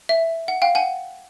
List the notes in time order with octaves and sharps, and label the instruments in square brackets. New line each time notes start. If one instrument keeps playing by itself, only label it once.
[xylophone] E5
F#5
F5 G5
F#5 G#5